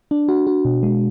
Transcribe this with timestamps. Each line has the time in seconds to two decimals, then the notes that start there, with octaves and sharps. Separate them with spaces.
0.11 D4
0.29 F#4
0.47 F#4
0.65 B2
0.83 G#3